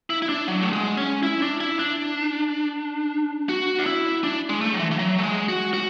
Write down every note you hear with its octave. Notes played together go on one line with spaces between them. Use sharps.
E4
E4
D4
F#3
A3
G#3
C#4
E4
D4
E4
D4
F#4
D4
E4
D4
G#3
A3
F#3
E3
E3
F#3
A3
G#3
F#4
F#4